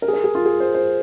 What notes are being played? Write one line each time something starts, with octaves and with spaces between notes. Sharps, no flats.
A#4
G#4
A#4
G#4
F4
G#4
C5
C5